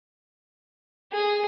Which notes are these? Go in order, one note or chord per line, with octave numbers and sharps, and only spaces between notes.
G#4